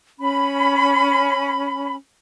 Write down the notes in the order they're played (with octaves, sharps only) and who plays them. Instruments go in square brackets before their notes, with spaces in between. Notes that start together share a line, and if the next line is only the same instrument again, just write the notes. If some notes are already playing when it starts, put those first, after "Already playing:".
[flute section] C#4 B5